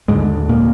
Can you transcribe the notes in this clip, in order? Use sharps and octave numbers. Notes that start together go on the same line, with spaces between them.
D#2 G#2 D3 G#3
A#2 A#3